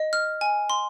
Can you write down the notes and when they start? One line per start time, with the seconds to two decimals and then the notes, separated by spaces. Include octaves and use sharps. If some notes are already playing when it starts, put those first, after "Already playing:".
Already playing: D#5
0.13 F6
0.41 G#5
0.70 C6